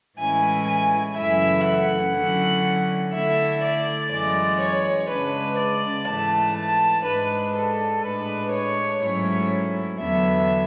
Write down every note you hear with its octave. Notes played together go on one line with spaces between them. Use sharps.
A2 E3 G#3 C#4 E4 G#5
G#5
F#2 C#3 E3 A3 E4 E5
F#5
D3 F#3 C#4 E4
D3 A3 E4 E5
D5
F#2 E3 G#3 D5
C#5
C#3 G#3 D4 B4
D5
G#2 E3 A3 A5
A5
G#2 G#3 D4 B4
A4
A2 G#3 D4 B4
C#5
G#2 F#3 A3 C#4 E4 C#5
E2 D3 F#3 B3 D4 E5